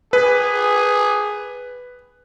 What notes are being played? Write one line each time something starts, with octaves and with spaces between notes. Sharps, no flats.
G#4 B4